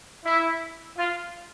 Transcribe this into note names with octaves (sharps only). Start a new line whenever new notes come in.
E4
F4